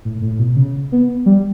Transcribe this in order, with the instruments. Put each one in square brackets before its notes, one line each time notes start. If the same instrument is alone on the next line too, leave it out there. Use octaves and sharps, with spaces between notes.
[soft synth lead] A2
A2
B2
C#3
B3
G3